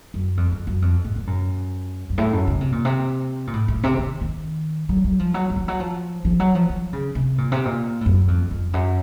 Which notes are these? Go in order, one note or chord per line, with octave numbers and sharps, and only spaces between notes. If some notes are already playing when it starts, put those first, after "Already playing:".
F#2
F2
F2
F#2
F2
A2
A#2
F#2
F#2
A2
F#2
C#3
C3
A#2
C3
A#2
A2
A2
C3
D#3
D#3
F#3
F#3
F3
F#3
F#3
F3
F#3
F3
F3
F#3
F3
F3
C#3
C3
A#2
C3
A#2
A2
F#2
F2
F2
F#2